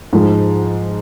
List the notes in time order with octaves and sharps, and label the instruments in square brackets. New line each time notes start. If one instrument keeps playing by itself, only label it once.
[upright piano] G#2 F3 G#3